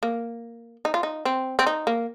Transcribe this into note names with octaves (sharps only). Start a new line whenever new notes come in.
A#3
D#4
F4
D#4
C4
C4
D#4
A#3